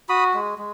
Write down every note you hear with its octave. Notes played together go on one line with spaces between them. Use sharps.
F#4 B5 D#6
G#3
G#3